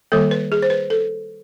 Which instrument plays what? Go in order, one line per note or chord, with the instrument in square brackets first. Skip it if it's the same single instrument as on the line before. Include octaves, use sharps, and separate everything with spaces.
[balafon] D#3 G3 A#3 A4
B4
G#4
C5
B4
A4